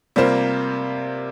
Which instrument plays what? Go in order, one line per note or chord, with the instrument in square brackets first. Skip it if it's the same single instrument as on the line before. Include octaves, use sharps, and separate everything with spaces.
[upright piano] C3 G3 A#3 F4 C5